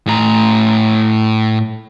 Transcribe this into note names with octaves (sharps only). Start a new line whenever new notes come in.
A2 A#5